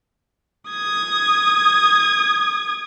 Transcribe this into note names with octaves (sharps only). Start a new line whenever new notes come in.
D#6 G#6